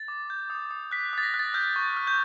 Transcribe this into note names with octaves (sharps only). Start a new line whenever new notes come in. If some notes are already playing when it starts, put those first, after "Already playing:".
Already playing: A6
D6
G6
D#6
D#6
F#6 B6
D#6 A6
A#6
F#6
A6
F6 G6
C#6
F6
G6